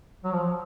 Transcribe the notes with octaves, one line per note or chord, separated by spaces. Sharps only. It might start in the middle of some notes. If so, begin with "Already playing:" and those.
F#3
F3